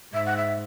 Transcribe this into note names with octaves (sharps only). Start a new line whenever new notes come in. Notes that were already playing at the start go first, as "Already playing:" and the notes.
G#2 E5
F#5
E5